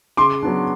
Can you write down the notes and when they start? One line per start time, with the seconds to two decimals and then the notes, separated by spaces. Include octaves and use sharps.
0.17 C#3 C6 D6
0.43 F#3 B3 D4